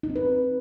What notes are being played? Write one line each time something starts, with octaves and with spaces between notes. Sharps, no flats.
D#4
C4
B4